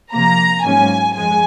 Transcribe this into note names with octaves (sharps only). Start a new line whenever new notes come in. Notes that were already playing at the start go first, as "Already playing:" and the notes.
C3 F3 A#3 A#5
G#2 F#3 A#3 C#4 G#5
F#2 F3 G#3 G#5